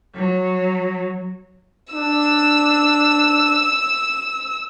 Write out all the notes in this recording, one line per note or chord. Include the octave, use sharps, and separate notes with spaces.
F#3
D4 E6